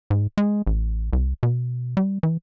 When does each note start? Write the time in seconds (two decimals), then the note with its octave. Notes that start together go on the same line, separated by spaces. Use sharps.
0.10 G#2
0.38 G#3
0.67 A1
1.13 C2
1.43 B2
1.97 G3
2.23 E3